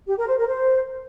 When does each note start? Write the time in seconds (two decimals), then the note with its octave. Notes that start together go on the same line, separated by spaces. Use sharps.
0.08 G4
0.18 A#4
0.28 C5
0.38 A#4
0.48 C5